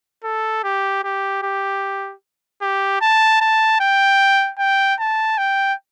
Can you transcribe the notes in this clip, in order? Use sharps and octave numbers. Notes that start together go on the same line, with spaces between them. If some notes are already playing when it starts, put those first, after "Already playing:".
A4
G4
G4
G4
G4
A5
A5
G5
G5
A5
G5